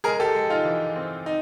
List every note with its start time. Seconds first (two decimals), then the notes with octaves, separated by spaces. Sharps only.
0.04 G#3 G#4 A#4
0.20 G4 A4
0.34 G#3
0.50 D#4 F4
0.65 E3
0.96 C4
1.26 D#4